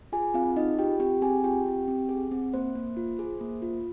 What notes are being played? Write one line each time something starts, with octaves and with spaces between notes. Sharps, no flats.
F4 G#4 G#5
C4 F4 F5
D#4 G#4 D#5
F4 G4 G5
C4 G4 G5
C4 G#4 G#5
F4 G4 G5
C4
C4
G#4
C4
A#3 C5
A#3
F4
G#4
A#3
F4